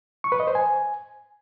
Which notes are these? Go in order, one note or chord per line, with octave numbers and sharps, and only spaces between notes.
C#6
B4
D#5
C5
G#5